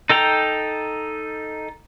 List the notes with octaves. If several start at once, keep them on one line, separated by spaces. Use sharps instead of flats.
D#4 A4 G5 A#5